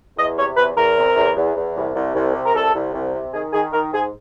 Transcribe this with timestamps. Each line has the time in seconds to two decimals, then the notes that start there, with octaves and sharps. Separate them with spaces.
0.17 E2 D#5
0.37 C3 C#5
0.57 E2 B4
0.77 E2 A#4
0.97 C3
1.16 E2
1.36 E2
1.55 E2
1.76 C2
1.95 C2
2.15 C2
2.35 C3
2.46 A#4
2.55 C2 A4
2.74 C2
2.94 C2
3.14 C3
3.34 D#3 G#4
3.53 D#3 G#4
3.73 D#3 A#4
3.93 G#2 G#4